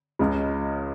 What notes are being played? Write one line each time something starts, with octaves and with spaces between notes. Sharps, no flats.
C#2 C#3 G#3